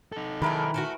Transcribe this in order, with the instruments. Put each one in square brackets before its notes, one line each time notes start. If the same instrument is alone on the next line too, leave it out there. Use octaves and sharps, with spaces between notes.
[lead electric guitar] D#4 A4
[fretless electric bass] D#3 [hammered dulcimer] E3 A#4 B4 [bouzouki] G#3 A3 D4
[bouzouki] A3 D4 F#4